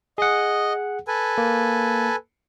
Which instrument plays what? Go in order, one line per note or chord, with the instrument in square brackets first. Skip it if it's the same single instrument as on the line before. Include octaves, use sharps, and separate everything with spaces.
[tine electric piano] G#4 F#5 [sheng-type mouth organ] D#5
[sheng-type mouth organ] A4 B4 G#5
[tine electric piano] A#3